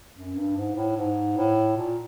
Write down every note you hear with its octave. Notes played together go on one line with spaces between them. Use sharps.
F#2
G2
G#2
A2
G#2
A2
A#2